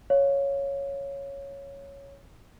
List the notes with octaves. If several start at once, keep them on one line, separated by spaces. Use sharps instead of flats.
C#5 F5